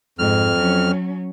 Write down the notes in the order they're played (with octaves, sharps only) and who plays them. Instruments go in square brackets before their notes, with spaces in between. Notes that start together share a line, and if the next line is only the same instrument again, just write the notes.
[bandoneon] F2 F6 [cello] G#2
[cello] F#3 C#4